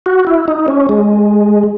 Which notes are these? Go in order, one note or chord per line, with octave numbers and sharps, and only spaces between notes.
F#4
E4
D#4
C#4
G#3